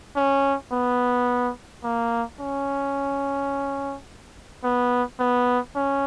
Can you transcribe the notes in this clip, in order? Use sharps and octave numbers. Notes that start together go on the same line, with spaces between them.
C#4
B3
A#3
C#4
B3
B3
C#4